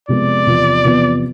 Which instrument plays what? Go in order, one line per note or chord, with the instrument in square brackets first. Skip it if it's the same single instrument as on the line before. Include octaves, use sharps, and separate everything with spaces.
[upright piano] F2 C3 G#3 B3 [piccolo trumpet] D5
[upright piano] E2 C3 F3 B3 F4
E2 C3 F3 B3 F4